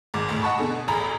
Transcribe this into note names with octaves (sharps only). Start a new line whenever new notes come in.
G#1 G#2 D6
G#1 D2 A2
D#5 F#5 A5 B5 C#6
B2 D3 G#4
A1 D2 G#4 A#5 B5